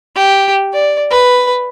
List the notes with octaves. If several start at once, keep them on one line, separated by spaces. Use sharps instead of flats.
G4
D5
B4